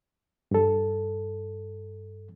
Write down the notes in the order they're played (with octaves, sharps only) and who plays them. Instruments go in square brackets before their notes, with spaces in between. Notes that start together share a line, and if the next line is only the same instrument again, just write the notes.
[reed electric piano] G2 A4